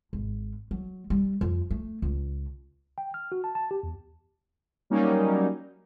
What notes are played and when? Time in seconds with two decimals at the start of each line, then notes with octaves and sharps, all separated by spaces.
0.13 G#1
0.71 F#3
1.10 G3
1.41 F2
1.71 A3
2.02 C#2
2.98 G5
3.14 F6
3.32 F#4
3.44 A5
3.55 A5
3.71 G4
3.83 E2
4.90 F#3 G3 A#3 C#4 D#4